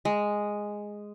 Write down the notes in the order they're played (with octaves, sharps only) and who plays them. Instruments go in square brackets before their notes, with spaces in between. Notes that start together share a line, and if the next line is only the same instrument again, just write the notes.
[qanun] G#3